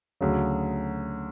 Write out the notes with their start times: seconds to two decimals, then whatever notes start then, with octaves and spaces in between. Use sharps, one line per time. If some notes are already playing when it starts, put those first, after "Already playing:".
0.21 D2 C#3 F#3